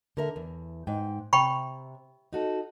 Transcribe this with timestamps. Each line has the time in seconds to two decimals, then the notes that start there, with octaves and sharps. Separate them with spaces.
0.17 D3 A#4 E5
0.36 E2
0.87 G#2 G5
1.33 C3 G5 B5 C#6
2.33 D#4 F#4 A4